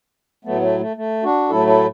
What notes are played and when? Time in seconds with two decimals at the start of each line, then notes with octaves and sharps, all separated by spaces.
0.45 A2 F#3 A3 B3
0.62 A3
0.80 A3
0.96 A3
1.23 D4 F#4
1.49 A2 F#3 A3 E4 A4
1.67 E4 A4